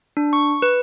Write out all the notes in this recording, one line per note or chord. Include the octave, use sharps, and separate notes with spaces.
D4
C#6
B4